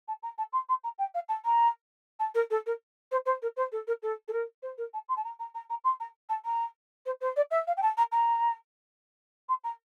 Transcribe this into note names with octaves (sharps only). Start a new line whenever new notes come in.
A5
A#5
A5
C6
C6
A#5
G5
F5
A5
A#5
A5
A#4
A4
A#4
C5
C5
A#4
C5
A4
A#4
A4
A4
A#4
C5
A#4
A5
C6
A5
A#5
A#5
A#5
A#5
C6
A#5
A5
A#5
C5
C5
D5
E5
F5
G5
A5
A#5
A#5
C6
A#5